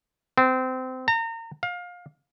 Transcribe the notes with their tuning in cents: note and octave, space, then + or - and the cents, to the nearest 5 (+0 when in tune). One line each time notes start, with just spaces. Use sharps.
C4 -25
A#5 -35
F5 +25